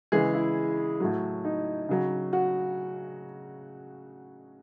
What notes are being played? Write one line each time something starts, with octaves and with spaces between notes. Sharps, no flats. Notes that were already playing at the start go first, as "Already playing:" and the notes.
C#3 E3 G#3 G#4
E4
A2 F#3
D#4
C#3 F#3
F#4